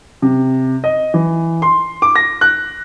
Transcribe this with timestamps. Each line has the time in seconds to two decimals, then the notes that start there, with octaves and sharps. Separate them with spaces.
0.22 C3
0.84 D#5
1.14 E3
1.62 C6
2.02 D6
2.15 A#6
2.41 F#6